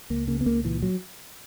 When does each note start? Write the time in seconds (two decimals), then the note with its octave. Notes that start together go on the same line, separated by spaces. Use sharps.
0.10 C#2 A#3
0.28 C#3 A#3
0.41 B3
0.46 C#2 A#3
0.64 A#2 E3
0.82 F#3